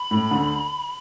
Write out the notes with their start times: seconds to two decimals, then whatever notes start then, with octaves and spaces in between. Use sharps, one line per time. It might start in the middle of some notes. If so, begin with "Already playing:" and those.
Already playing: B5
0.11 A2
0.31 D2 D3